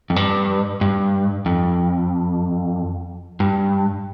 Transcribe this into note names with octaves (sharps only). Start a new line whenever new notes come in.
F2
G2
G2
F2
G2